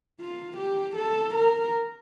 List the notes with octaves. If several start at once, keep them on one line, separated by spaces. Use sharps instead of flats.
F4
G4
A4
A#4